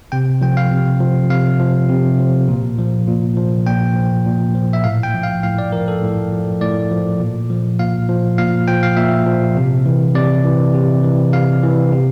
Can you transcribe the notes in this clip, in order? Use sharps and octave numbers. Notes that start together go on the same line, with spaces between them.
C3 G5
F3 G5
F5
C3
F3
C3 F5
F3
C3
F3
A#2
F3
A#2
F3
A#2 G5
F3
A#2
F3
E5
A2 F5
G5
F3
F5
A2 F5
D5
F3 A#4
A4
A2
F3
A2 D5
F3
A#2
F3
A#2 F5
F3
A#2 F5
F3 G5
F5
A#2 E5
F3
C3
E3
C3 D5
E3
C3
E3
C3 F5
E3
C3